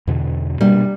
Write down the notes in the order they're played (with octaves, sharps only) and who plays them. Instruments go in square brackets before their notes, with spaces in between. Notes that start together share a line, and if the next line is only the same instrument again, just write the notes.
[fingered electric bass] E2 B2 D3
[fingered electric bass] B2 A#3 D4 [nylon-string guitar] G3